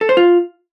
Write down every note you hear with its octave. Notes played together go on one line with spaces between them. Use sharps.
A4
C5
F4